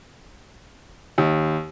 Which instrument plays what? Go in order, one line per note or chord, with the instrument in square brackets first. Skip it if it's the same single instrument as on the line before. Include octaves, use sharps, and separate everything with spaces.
[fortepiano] D#2